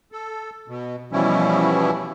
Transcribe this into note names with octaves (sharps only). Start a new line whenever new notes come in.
A4
B2
B2 E3 F3 G3 C#4 E4